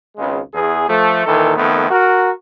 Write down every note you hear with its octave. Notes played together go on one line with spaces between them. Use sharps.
G#1 C#2 C#3 G#3
E2 G#4
F3 A3
A#2 D#3 E3 A4
F2 D#3 A3 B3
F#4 A#4